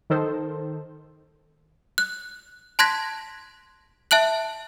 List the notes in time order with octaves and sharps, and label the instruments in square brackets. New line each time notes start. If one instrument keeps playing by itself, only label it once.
[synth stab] D#3 A4 C5
[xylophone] F#6
A5 C6 F#6 G#6 A#6 B6
E5 A5 F#6 F#7